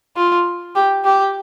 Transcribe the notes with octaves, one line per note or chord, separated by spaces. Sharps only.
F4
G4
G4